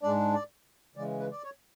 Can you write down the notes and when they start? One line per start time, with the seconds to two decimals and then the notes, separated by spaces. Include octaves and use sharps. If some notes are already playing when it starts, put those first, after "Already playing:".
0.03 G#2 G#3 D4 D5
0.34 D5
0.96 C#3 E3 G#3 D5
1.19 B4
1.31 D5
1.43 C#5